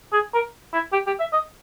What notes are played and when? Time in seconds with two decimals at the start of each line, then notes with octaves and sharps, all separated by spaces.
0.13 G#4
0.34 A#4
0.73 E4
0.93 G4
1.07 G4
1.20 E5
1.33 D#5